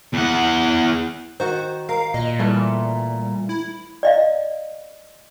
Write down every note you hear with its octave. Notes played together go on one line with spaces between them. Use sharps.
E2 F#5
D#3 F#4 C5
A#4 F5
A#2 D#5
E3 G3 A3
E4
D5 D#5 F5